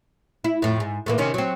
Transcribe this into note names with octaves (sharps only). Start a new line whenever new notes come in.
E4
F2 A2
G#2
A2 E3 A#3
C3 D#3 C#4
F#3 C4